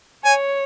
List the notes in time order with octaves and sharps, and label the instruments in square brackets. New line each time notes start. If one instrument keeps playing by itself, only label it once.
[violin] C#5 [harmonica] G#5